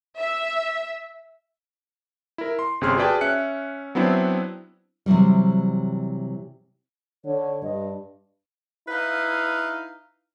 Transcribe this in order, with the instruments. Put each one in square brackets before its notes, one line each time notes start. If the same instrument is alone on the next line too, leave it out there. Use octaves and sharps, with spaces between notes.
[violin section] E5
[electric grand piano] E4 A#4
C6
G1 C3 C#4 G#4 C6 F6
F#4 G#4 B4 D5 G5 A5
C#4 E5 F#6 C#7
F#3 B3 C4 D4 E4
[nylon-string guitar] C3 E3 F#3 G3
[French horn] D3 [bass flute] C#5
[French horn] G2 [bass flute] D#5
[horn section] D#4 E4 B4 F5